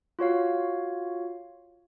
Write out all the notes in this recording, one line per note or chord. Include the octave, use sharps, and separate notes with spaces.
F4 F#4 C#5 F5